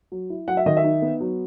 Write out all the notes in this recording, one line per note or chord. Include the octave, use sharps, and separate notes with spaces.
F#3
E4
F#3 F#5
E5
D#3 D#5
E5
D#4
B3
F#3